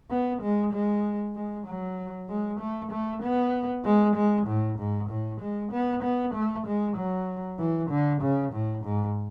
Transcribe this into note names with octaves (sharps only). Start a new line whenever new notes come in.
B3
G#3
G#3
G#3
F#3
G#3
A3
A3
B3
G#3
G#3
A2
G#2
A2
G#3
B3
B3
A3
G#3
F#3
E3
D3
C#3
A2
G#2